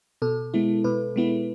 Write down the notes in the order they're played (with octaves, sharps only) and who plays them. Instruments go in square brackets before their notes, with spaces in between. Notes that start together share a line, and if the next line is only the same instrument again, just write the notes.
[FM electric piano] B2 A4
G#3 B3 E4
B2 B4
G#3 B3 E4